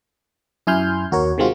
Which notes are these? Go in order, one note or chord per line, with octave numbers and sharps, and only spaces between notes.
F#2 E4 G#5 C6 F6 G6
D#2 F#4 A#4 C#5
C3 D#3 G#3 C4 F4 F#4